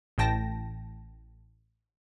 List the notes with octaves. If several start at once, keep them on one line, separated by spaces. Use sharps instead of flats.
A1 A2 G5 A5 A#6